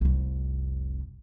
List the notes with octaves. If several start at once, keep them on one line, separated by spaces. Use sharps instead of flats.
F1 C2